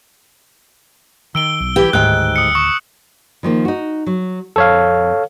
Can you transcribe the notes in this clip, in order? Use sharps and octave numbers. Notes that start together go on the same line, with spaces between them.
D#3 E6 D7 G7
B1
E3 G4
D1 D2 G#2 D#3 G5 F#6
D#6 C#7
C#6 D#6
D#3 F3 A#3
D#4 F#4
F#3
F2 A4 C#5 F5